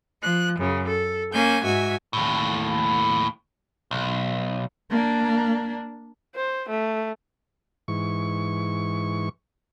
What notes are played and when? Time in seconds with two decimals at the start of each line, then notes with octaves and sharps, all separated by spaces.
0.22 F3 F#6
0.59 F#2 C#3
0.87 A4
1.33 A#3 C#4 G#5 G6
1.64 G#2 F#4 E5 G#5
2.13 D#2 A2
3.91 B1
4.90 A#3 D4
6.35 C5
6.69 A3
7.88 G#2 E3 C#6